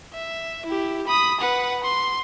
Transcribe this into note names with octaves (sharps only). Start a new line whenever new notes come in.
E5
E4 G4
B5 D#6
B4 F#5
C6